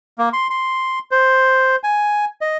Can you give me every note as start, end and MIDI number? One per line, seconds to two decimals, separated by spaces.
0.18 0.29 58
0.33 0.47 84
0.50 0.99 84
1.11 1.76 72
1.84 2.25 80
2.41 2.57 75